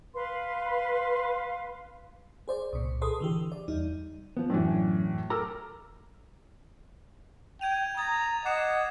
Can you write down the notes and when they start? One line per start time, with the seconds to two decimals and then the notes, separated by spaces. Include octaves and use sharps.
0.14 B4 F5 C6
2.48 G#4 C5 D5
2.73 C2 A#2
3.02 G#4 A4 B4 C6 D#6
3.20 D3 E3 G4
3.52 D5
3.68 E2 G3 D#4
4.37 F3 B3
4.50 F#2 A2 E3 D4
5.30 A4 A#4 A#5 D6 E6 F6
7.61 G5 G#6 D#7 F7
7.97 A#5 D#6 G#6 A6
8.46 D#5 F#5 D6 C7 E7